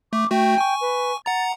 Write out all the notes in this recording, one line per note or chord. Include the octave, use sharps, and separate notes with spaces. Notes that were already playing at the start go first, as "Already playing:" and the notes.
A3 D6
A3 F#4 G5
G#5 C#6
B4
F#5 A#5 A6